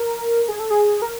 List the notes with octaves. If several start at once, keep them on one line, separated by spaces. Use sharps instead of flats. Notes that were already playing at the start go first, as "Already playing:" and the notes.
Already playing: A#4
G#4
A4
G#4
A#4